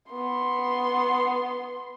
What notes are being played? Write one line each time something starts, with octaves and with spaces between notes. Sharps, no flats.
B3 C6